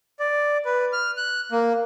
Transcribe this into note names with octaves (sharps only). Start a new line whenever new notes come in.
D5
B4
F6
F#6
A#3